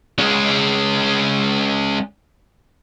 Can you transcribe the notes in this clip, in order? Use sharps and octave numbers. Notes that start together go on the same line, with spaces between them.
G#3 C#4